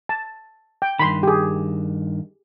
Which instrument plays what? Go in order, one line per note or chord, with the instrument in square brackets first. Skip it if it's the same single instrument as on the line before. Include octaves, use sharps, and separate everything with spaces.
[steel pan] A5
G5
[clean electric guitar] G2 D#3 [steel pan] B5 C6
[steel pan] G4 G#4